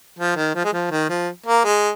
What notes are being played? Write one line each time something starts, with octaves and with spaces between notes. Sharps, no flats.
F3
D#3
F3
G#3
F3
D#3
F3
A#3
G#3